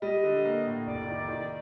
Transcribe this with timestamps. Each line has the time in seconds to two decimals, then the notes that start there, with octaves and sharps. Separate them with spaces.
0.02 G3 D#5
0.23 D3
0.45 A#3
0.65 A2
0.86 F1 D5
1.07 D#3
1.29 D#3